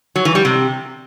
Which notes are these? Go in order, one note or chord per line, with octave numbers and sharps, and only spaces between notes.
F#3
E3
G3
C3